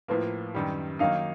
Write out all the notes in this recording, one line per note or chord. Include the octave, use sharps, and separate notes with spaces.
A2 F3 A#3 B4
F#2 D#3 G3
D#3 F#3 A#3 D#4 F5